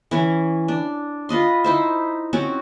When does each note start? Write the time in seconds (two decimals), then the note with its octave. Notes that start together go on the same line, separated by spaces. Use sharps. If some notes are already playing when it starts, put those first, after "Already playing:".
0.11 E3 C#4
0.68 D4
1.29 F4 B4 D#5 C6
1.64 D#4 E4 C5
2.33 C4 C#4 F#4